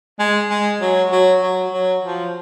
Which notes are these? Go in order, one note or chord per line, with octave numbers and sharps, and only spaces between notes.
G#3
G#3
F#3
F#3
F#3
F#3
F3